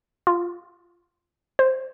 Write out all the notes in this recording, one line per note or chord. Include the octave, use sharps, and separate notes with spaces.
F4
C5